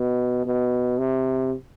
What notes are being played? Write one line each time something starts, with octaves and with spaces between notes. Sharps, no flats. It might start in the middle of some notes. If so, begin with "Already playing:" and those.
Already playing: B2
B2
C3